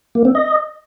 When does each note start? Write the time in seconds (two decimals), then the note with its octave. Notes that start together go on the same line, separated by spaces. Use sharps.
0.15 A#3
0.25 C4
0.35 D#5